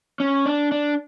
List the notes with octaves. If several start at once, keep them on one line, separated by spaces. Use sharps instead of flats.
C#4
D4
D4